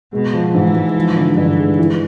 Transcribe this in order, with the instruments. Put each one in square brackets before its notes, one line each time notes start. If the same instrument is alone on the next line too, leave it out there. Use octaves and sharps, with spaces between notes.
[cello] B2 [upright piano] G#3
[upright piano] F3
[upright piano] G#2 [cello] E3
[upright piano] G#2
F3
D3
[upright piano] G2 [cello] E3
[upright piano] G#3
E3